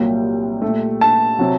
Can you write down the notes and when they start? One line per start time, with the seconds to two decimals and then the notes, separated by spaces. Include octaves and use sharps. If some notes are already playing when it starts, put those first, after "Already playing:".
Already playing: C2 A#2 F#3 A#3 G5
0.62 A#2 A3
1.01 A5
1.39 C3 F#3